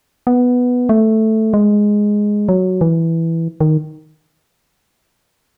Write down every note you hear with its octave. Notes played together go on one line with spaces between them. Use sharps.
B3
A3
G#3
F#3
E3
D#3